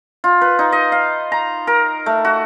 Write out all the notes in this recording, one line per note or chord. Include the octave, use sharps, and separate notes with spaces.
F4
B4
D#4
D#5
F5
A#5
A#4
A3
F#4